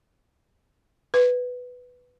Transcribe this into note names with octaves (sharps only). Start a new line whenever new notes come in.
B4